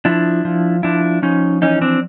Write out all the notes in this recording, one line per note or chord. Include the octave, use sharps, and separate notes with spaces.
F3 D4 E4
F3
F3 D4 E4
F3 C#4 D#4
E3 C#4 D#4
C4 D4